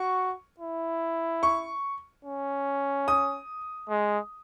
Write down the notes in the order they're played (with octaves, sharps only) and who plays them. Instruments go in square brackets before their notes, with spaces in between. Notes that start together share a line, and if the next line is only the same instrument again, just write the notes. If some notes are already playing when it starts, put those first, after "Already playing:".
Already playing: [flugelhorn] F#4 [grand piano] C#6
[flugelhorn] E4
[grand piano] C#6
[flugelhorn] C#4
[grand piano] D#6
[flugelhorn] G#3